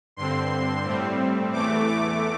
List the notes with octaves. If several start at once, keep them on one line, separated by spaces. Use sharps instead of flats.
G2 D3 C4 C6
A2 G3 C4
E2 E3 A3 D6
D6